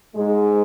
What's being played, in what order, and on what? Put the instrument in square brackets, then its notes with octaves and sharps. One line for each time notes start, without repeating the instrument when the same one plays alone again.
[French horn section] G#2 G#3